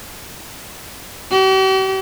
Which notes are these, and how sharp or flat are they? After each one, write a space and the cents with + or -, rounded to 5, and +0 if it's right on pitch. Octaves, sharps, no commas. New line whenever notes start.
G4 -45